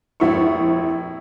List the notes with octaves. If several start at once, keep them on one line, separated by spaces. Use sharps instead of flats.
F1 A#1 E4 C#6